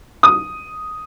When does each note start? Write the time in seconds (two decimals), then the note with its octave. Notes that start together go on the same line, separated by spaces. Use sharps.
0.23 D#6